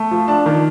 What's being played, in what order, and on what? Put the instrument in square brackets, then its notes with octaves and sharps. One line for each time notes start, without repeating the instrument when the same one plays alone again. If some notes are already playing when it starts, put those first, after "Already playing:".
Already playing: [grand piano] A3
F3
D4 A5
D#3